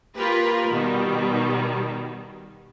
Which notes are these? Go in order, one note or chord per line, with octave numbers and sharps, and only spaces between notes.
A#3 F4 G4 A#4 B4
B2 D#3 G3